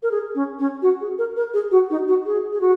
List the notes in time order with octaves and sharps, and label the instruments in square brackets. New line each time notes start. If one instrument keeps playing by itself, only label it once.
[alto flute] A#4
G#4
C#4
C#4
F#4
G#4
A#4
A#4
G#4
F#4
D#4
F#4
G#4
G#4
F#4